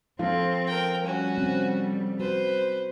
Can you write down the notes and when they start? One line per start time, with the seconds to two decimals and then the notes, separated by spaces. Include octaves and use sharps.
0.19 F3 C4 A4 F5
0.67 A#4 G5
1.04 G3 C#4 F#4
1.38 C4
2.20 F#4 B4 C5